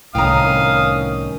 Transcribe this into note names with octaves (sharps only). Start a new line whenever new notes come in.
C2 A2 D#3 C#4 F5 G5 A#5 D#6